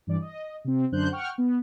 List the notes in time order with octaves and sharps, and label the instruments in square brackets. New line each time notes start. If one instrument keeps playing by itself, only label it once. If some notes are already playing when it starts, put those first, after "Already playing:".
[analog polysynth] G2 E3 D5
D#5
C3 C4
F#2 D3 C5 F#6 G6
F#5 G5 C#6 F6
B3